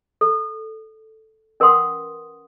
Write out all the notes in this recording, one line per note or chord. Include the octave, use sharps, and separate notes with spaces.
A4
C#4 A#4 B4 F#5 C6 D#6